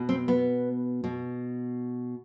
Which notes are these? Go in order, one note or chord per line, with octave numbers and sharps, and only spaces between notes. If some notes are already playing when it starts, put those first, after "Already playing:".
Already playing: B2
C4
B3
B2